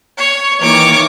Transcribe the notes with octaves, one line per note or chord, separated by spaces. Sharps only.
C#5
D#3 E3 A#3 C#5 D6